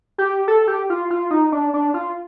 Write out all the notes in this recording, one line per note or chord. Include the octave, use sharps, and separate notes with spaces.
G4
A4
G4
F4
F4
D#4
D4
D4
F4